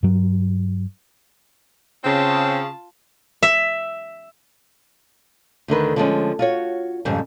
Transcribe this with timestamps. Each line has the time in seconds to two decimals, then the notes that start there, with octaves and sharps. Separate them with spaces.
0.03 G2 F#3
2.04 C#3 C4 F4 A5
3.43 E5
5.68 D2 D3 D#3 B4
5.96 D3 F3 G#3 C#4
6.39 F4 F#4 C#5
7.05 F2 G#2 C#3 G3